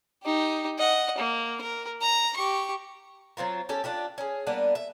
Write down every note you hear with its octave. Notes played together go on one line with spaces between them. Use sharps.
D#4 G4
D#5 F#5
A#3
A#4
A#5
G4 C#6
F#3 C4 F4 A#4
C#4 G4 A4
D4 F4 G4
C#4 G#4
G3 A#3 B3 D4
E5